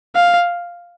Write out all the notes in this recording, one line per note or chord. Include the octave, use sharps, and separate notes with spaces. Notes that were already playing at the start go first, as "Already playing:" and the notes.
F5